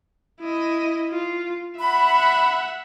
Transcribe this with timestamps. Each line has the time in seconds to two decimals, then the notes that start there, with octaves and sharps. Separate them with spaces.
0.40 E4 D#5
1.11 F4
1.79 E5 F#5 B5